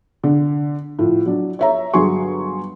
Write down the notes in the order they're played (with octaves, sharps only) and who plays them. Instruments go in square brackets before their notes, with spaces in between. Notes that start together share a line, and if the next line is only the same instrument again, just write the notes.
[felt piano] D3
A2 F3
F#3 D4
C#5 E5 A#5
G1 F#3 G#4 G#5 C6 C#6